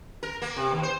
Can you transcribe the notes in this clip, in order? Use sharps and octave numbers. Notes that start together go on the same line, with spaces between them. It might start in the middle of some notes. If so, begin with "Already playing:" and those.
A#4
A#3
C3
D#2
C5